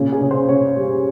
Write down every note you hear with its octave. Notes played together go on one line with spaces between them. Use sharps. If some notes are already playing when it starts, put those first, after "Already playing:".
Already playing: A#2 C#3
G#4
C#3
C5
C#3 C#5
G3